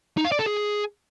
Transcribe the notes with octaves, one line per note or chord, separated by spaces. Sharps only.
D#4
F5
D5
A4
G#4